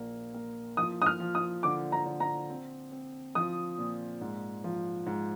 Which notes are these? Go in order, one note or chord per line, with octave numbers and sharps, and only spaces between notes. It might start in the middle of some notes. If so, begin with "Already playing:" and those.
Already playing: A#1 A#2 A#3
A#3
F3 D#6
D#6
F6
F3
D#6
D3 D6
A#5
D3
A#5
C4
C4
F3 D#6
A#2
G#2
F3
G#2